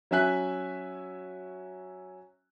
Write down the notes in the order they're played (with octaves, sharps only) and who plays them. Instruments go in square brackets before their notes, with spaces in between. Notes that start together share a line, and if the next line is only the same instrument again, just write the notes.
[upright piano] F#3 C#4 E5 G#5 F#6 B6